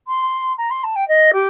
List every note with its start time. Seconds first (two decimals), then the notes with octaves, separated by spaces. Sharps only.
0.07 C6
0.57 A#5
0.70 C6
0.83 A5
0.95 G5
1.08 D#5
1.33 G4